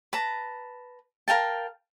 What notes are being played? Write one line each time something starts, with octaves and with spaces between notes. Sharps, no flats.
B4 A5 A#5
A#4 F5 G5 A5